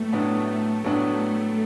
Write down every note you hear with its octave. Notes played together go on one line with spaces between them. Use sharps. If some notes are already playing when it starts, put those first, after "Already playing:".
Already playing: A2 F#3 A3 B3
A2 F#3 B3 D4
A2 F#3 A3 B3 D4